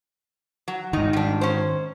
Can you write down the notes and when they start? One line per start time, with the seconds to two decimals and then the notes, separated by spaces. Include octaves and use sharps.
0.68 F#3
0.93 G#2 D#3 D#4
1.13 G3 D4
1.41 C#4 C5